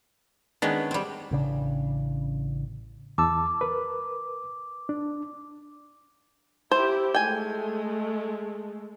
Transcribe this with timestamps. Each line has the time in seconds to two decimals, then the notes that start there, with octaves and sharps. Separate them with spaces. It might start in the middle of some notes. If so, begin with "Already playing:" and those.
0.62 D#3 G#3 B3 C#4 D4
0.91 G3 C4
1.31 A1 C#3 D4
3.18 E2 A5 D6 E6
3.61 A#4 B4
4.89 D4
6.71 E4 G4 C5
7.14 G#3 A3 G5 G#5